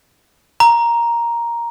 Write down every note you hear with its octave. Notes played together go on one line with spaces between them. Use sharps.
A#5